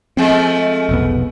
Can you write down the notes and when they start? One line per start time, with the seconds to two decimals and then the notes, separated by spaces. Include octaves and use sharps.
0.17 F3 G#3 A3 C4
0.89 F1 B1 B3